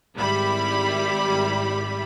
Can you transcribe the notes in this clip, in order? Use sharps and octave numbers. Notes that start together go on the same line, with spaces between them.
G#1 G3 E4 B5